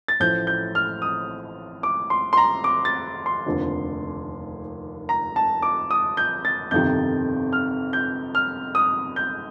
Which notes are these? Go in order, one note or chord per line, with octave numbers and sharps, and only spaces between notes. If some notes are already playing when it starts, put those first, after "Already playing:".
A6
A1 A2 F3 G6
G6
F6
D#6
D6
C6
C6
A#5
D6
A6
C6
F1 D#2 D3 F3
A#5
A5
D6
D#6
G6
A6
G1 F2 C3 D#3 G6
F6
G6
F6
D#6
G6